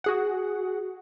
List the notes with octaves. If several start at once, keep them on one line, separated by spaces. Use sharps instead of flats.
F#4 G#4 F#5